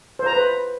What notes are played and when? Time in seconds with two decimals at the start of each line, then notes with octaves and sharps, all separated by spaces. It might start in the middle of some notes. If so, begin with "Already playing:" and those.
0.19 C5
0.26 A#5
0.33 B4